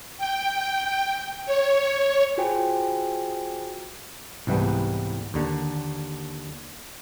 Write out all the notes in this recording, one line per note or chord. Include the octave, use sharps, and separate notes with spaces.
G5
C#5
F4 F#4 G#4 C5 G5 G#5
C2 G#2 E3 G3 A3 B3
D#2 D3